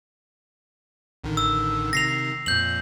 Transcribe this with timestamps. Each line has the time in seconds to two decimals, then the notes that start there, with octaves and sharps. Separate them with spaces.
1.24 A1 D3 D#3
1.37 E6
1.93 C3 D#3 A#6 C7 F7
2.46 F2 A#2 G6 F#7